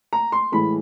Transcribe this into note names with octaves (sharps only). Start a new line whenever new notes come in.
A#5
C6
A2 E3 G#3 B5